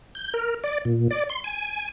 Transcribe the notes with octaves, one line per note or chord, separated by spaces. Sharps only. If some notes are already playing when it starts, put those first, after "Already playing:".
G6
A#4
D5
A#2
D5
C6
G#5